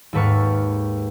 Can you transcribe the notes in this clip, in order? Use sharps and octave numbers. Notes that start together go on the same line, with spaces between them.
D#2 G#2 A4 B4 C#6 F6